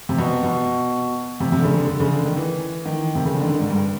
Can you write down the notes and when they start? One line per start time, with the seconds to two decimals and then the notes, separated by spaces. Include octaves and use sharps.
0.09 C3
0.18 B2
0.43 B2
1.40 C3
1.52 C3
1.59 D3
1.64 C#3
1.77 D3
1.89 D3
2.00 C#3
2.13 D3
2.25 D#3
2.37 E3
2.85 D#3
3.15 C3
3.25 C#3
3.35 D3
3.42 D#3
3.47 D3
3.59 G#2
3.70 G2